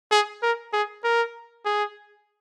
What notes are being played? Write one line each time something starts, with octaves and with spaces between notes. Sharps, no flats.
G#4
A#4
G#4
A#4
G#4